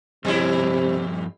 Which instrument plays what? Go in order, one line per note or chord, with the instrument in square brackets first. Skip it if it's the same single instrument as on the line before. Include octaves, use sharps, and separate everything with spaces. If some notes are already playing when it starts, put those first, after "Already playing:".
[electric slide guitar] G2 F3 C#5 [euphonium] C3 [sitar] G3 E4